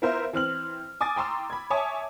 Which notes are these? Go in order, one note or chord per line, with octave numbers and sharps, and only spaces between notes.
B3 E4 F4 A#4 C5 E5
E3 C4 F6 F#7
G#5 D6 D#6 A6
G5 A#5 C6 C#6 E6
B5 G#6
C#5 E5 G#5 A5 D6 D#6